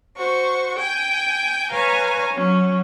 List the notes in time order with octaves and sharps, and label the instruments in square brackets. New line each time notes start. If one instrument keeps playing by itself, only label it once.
[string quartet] F#4 C5 C#6
G5 G#5 G6
B4 C#5 F5 G#5 A#5
F#3 C#4 C#5